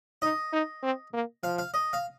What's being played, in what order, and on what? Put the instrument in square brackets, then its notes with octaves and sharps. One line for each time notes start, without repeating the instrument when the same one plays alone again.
[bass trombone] D#4 [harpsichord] D#5
[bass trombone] D#4
C4
A#3
[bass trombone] F3 [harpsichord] F5
[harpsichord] F5
D#5
F5